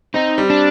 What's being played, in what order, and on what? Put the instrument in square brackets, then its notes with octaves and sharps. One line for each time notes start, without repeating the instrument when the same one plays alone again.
[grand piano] C4 [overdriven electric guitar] D#4
[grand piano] G3
[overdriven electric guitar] D4